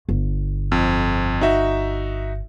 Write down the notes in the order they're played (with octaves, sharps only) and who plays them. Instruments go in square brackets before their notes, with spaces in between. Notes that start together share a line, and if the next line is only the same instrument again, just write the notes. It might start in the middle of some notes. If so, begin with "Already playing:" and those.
[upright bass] G1
[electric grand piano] F2
D#4 F#4 E5